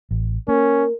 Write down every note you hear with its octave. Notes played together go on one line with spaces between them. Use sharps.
A1
A#3 C#4 A#4